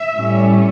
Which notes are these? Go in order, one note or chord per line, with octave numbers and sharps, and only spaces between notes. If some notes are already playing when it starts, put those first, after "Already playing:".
Already playing: E5
A2 G3 C#4